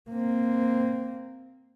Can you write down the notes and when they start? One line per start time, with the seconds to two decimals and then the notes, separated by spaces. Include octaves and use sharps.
0.11 A#3 C4